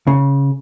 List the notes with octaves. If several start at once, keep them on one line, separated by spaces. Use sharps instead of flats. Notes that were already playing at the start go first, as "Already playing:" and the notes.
C#3